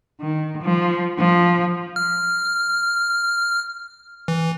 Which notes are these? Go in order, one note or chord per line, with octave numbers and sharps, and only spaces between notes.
D#3
F3
F3
F6
E3